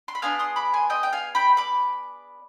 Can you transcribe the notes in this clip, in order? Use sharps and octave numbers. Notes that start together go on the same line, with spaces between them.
C6
B5
B3 D4 G#4 F5 G#5
C6 D#6
B5 D6
G#5 C6
D#5 G5
G5
F5 G#5
G5 B5
B5 D6